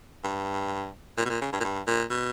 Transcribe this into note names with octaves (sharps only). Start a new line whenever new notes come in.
G2
A#2
B2
A#2
C#3
G2
A#2
G2
A#2
B2